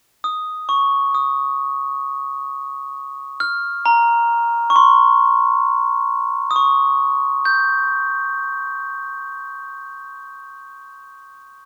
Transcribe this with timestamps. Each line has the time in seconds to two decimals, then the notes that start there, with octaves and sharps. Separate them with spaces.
0.24 D#6
0.69 C#6
1.15 D#6
3.40 F6
3.86 A#5
4.70 C#6
4.76 C6
6.51 D#6
6.56 C#6
7.45 G6